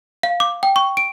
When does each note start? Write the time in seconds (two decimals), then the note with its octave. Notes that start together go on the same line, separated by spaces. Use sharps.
0.23 F5
0.40 D6
0.63 G5
0.76 C#6
0.97 D7